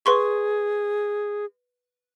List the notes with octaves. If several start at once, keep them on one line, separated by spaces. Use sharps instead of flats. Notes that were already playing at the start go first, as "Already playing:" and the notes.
G#4 B4 C6 C#6